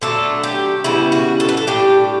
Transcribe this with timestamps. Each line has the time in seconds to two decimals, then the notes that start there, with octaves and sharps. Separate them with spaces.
0.02 D3 F#3 A3 D4 A4
0.44 G4
0.84 C#3 E3 G3 B3 E4
1.12 F#4
1.40 A4
1.49 B4
1.57 A4
1.67 A2 G3 D4 G4